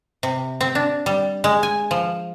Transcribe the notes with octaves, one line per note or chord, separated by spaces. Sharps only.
C3
C4
D4
G3
G#3
G#5
F3